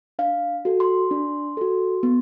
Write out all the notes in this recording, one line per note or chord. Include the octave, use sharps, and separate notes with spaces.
D4 F5
F#4 A4
C6
D4
F#4 A4
B3